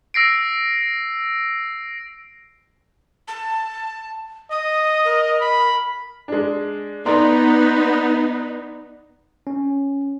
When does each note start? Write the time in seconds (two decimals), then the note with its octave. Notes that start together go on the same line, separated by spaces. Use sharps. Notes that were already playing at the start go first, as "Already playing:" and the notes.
0.14 E6 A#6 C7 D7
3.28 A5
4.51 D#5 D#6
5.05 A#4
5.41 B5
6.28 G#3 D4
7.06 B3 D#4 D5 A#5 C6
9.47 C#4